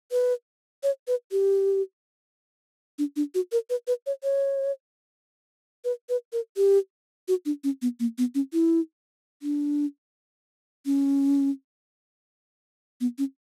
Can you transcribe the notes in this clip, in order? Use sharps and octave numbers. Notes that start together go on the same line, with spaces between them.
B4
C#5
B4
G4
D4
D4
F#4
A#4
B4
B4
C#5
C#5
B4
B4
A#4
G4
F#4
D4
C#4
B3
A#3
B3
C#4
E4
D4
C#4
B3
C#4